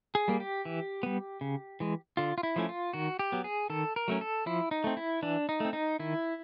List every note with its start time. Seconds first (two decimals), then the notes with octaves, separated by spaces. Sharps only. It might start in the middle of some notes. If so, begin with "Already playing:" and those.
0.15 G#4
0.28 G3 A#3
0.40 G4
0.65 E3
1.03 G3 B3
1.41 C#3
1.80 E3 G#3
2.17 D3 F4
2.38 F4
2.43 E4
2.56 F3 A3 C#4
2.69 F4
2.93 D#3 F#4
3.19 G4
3.32 F#3 B3
3.44 G#4
3.70 D#3 A4
3.96 A#4
4.08 F#3 A3 C#4
4.21 A4
4.46 F3 E4
4.71 D#4
4.84 A3 C4
4.97 E4
5.22 E3 D4
5.49 D#4
5.60 A3 C4
5.73 D#4
5.99 D#3 E4